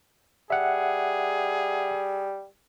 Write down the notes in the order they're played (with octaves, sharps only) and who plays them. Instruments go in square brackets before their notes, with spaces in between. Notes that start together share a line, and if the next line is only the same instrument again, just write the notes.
[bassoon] G3 [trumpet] G#4 [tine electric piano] E5 F#5